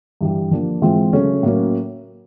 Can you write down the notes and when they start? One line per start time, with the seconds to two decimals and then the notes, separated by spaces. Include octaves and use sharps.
0.21 G2 E3 G3
0.51 F3 A#3 D4
0.82 G#2 E3 G#3 C4 F4
1.13 C#3 F#3 A3 C#4
1.43 A2 F#3 A#3 C#4